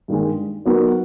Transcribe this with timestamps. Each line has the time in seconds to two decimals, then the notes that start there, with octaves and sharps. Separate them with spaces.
0.08 G2 D#3 G#3
0.65 F#3 B3 D#4 F#4 A#4